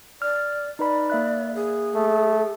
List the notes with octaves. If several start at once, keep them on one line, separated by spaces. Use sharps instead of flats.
D5 F6
D#4 B4 D5 B5
A#3 E5 F#6
G#4
A3